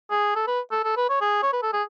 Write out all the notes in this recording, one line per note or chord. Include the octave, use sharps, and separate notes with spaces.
G#4
A4
B4
A4
A4
B4
C#5
G#4
C#5
B4
A4
G#4